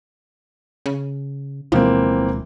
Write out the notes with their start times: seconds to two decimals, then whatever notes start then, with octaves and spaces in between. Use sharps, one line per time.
0.86 C#3
1.72 D1 B2 E3 F3 G#3 A#3 C4